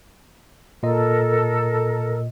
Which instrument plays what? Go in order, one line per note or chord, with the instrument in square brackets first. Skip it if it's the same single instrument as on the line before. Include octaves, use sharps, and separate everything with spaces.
[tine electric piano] A#2 D#5 [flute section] A4 A#4